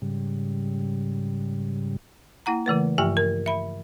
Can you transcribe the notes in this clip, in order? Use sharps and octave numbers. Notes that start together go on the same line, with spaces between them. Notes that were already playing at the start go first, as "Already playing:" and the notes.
G#2 C#3 G3
A#3 E4 F#5 A#5
C#3 E3 A3 B4
G2 F3 G4 E5 G5 C#6
A#4
E5 B5